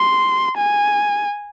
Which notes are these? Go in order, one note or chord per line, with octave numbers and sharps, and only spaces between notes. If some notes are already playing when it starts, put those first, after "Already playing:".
Already playing: C6
G#5